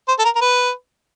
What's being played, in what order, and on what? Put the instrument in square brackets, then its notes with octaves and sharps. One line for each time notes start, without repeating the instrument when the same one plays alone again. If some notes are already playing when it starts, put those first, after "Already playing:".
[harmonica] C5
A4
A#4
A#4
B4